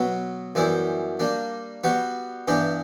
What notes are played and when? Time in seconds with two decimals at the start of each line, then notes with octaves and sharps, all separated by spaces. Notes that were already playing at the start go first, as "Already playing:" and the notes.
Already playing: B2 F#3 B3
0.55 F#2 E3 G3 B3 E4
1.19 G3 A#3 D4
1.84 G3 B3 F#4 B4
2.48 G2 E3 B3 D4 G4